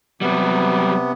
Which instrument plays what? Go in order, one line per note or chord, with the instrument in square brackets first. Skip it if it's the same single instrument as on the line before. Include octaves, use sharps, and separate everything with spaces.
[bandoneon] C3 B3 [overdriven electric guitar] F#3 G3